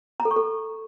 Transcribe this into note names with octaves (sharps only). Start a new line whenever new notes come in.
A#5
A4
C#6
A4